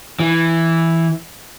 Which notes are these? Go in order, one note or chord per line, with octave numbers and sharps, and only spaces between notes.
E3